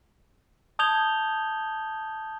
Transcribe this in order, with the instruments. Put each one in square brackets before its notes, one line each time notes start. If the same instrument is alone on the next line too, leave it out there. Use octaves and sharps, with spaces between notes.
[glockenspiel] A5 D#6 G6 G#6 F7 G7